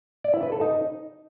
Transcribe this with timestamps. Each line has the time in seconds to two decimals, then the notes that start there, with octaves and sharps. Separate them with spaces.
0.24 D5
0.34 E4
0.43 B4
0.52 A4
0.61 D#4